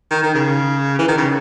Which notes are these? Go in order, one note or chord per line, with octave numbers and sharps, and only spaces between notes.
D#3
D#3
C#3
E3
D#3
C#3